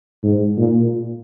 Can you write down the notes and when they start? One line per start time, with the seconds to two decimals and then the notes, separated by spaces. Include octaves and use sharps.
0.23 G#2
0.58 A#2